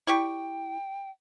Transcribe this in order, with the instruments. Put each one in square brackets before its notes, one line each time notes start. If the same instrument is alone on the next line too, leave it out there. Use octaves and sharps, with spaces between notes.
[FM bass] E4 [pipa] G4 D5 C#6 [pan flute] G5